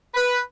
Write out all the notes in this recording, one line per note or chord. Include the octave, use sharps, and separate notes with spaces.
B4